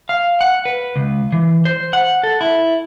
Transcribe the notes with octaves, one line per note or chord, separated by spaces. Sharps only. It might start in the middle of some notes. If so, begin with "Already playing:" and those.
F5
F#5
B4
C#2
E3
C5
F#5
A4
E4